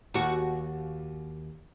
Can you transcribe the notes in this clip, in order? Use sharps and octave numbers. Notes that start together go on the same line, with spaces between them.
D#2 F#4